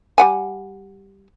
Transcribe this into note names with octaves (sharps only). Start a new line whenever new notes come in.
G3 F#5 G#5